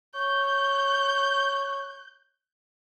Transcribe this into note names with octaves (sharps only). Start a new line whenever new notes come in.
C#5 G6